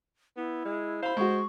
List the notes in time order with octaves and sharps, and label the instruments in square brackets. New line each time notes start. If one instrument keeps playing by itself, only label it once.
[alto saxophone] B3 [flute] E4
[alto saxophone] G#3
[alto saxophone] C5 [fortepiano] F5 B5
[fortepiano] G#3 F#4 [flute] C#6